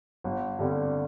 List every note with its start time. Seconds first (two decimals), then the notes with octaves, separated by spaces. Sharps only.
0.24 G1
0.59 G2 D3 G3 C4